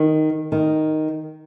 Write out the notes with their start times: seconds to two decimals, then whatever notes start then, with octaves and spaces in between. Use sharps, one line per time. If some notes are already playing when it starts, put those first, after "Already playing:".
Already playing: D#3
0.52 D#3